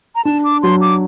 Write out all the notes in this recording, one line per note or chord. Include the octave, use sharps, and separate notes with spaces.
A#5
D4 A5
D6
F#3 C6
D6